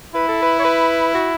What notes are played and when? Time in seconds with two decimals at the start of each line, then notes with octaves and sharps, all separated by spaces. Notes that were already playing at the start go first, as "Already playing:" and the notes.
0.15 E4 B4
0.29 A4
0.43 B4
0.59 C#5
0.65 B4
1.14 F#4